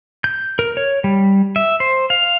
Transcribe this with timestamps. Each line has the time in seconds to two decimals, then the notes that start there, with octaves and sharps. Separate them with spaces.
0.24 G6
0.59 A#4
0.77 C#5
1.04 G3
1.56 E5
1.80 C5
2.10 F5